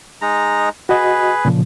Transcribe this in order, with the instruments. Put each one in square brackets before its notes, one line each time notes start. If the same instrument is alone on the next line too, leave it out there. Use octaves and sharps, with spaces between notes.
[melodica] G#3 D#4 A#5
[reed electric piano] F#4 D#5 [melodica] G#4 B4
[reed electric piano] A#2 C#3 F3